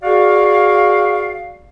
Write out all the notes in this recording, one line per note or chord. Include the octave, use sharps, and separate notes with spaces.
F#4 G#4 D5 F5